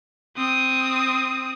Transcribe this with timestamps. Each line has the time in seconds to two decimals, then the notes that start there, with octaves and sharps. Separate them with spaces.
0.37 C4 D#6